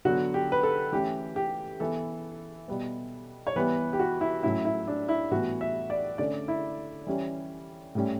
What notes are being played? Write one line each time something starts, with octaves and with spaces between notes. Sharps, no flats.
D3 F#3 B3 F#4
G4
B4
A4
E3 A3 C#4 G4
G4
E3 B3 A4
B2 G3 B3
C#5
E3 G3 B3 B4
G4
F#4
E4
A2 F#3 C#4 E4
E4
D4
E4
A2 E3 G3 B3 F#4
E5
D5
D3 A3 C#4 D5
E4
E3 G3 C#4
A2 G3 C#4